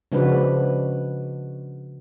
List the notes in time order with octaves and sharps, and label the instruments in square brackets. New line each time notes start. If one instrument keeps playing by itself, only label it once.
[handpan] C#3 F3 G#3 D4 F#4 B4